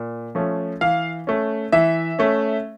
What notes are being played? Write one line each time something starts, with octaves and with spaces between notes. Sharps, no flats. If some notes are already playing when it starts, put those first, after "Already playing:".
Already playing: A#2
F3 A3 C#4
E3 F5
A3 C#4
E3 E5
A3 C#4